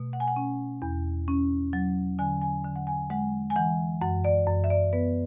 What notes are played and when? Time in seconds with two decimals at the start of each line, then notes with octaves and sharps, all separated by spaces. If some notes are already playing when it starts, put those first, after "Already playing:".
Already playing: B2 A3
0.13 F#5
0.20 G#5
0.28 F#5
0.36 C#4
0.82 E2
1.28 C#4
1.73 F#3
2.19 D3 G#5
2.42 G#5
2.64 D3
2.76 F#5
2.87 G#5
3.10 G#3 F#5
3.50 G#5
3.56 E3 F#5
4.02 F#2 F#5
4.24 D5
4.47 F#2
4.64 E5
4.70 D5
4.93 B3 B4